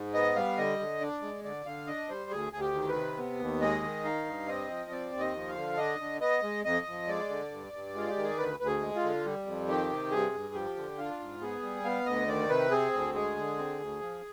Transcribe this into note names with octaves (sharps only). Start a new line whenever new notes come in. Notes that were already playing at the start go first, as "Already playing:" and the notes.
Already playing: G#2
B3 D#5
G3 F5
D3 D#5
D3
D4 D5
G#3
D3 D5
D3 F5
D4 D#5
G3 C5
D2 G#4
D2 G#4
G4
D#3
B4
C3
B3
D#2
G#3 D#5
D#3
D#4 F5
G2
C4 D#5
F3
C4 D5
D#2
D#5
F3
F5
D3
D4 D#5
D3
B3 D#5
G#3
F2 D#5
F2
G#3 D5
D3
G2
G2
G#3 F4
G4
D#3
G#4
D2 B4
D2 B4
G#4
G#3
F4
D3
G3
F2
D#3 G4
C3
G2 G#4
G2
F3 G4
D3
D4 F4
G#2
B3 G#4
G3
B3 F5
D2 D#5
D#3 D5
C3 B4
C4 G#4
D2
G#3 G#4
D3
C4
D2
F3